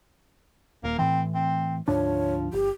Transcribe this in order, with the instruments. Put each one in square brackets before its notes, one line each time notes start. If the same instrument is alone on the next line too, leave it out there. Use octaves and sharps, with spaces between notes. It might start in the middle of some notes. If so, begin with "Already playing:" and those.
[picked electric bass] D#1 [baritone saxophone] A#3
[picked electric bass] A2 E3 [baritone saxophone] C4
[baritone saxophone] C4
[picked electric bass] D2 G#2 D4 [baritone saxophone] F3 [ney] C#5
[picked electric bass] G1 [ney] G4